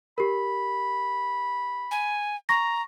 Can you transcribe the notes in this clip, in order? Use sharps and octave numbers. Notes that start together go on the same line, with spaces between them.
G4 A#4 B5
G#5
A#5 C#6 A#6